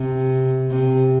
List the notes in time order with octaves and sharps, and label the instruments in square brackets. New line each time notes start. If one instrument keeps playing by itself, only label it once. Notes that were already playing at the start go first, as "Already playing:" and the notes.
Already playing: [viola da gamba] C3
C3